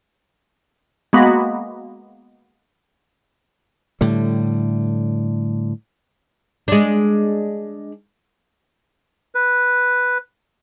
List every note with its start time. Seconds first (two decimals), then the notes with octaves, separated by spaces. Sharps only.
1.13 G#3 A#3 B3 F#4
4.01 A2 D3 G3
6.68 G#3 D4
9.35 B4